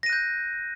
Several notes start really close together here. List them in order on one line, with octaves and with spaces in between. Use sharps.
A#6 D#7 F#6 G6